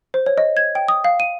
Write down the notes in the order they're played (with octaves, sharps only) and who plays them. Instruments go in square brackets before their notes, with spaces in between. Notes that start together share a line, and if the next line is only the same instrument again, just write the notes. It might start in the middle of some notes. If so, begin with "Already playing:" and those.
[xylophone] C5
C#5
D#5
G#6
G5
D#6
F5
D#7